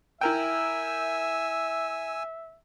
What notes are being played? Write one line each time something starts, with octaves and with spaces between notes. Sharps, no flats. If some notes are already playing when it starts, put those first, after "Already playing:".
E4 A#4 E5 G5 G#5 E6